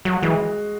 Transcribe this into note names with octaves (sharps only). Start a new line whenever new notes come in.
F#3 F#4
E3 G#3